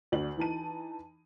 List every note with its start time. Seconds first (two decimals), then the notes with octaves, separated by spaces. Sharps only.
0.12 D2 D4 F#7
0.37 E3 D#4 A5 D#7